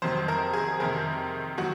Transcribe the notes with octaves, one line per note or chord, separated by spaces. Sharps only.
F2 C3 D#3 F#3 C5
A#4
G#4
F2 C3 D#3 A#4
D#3 F#3 F#4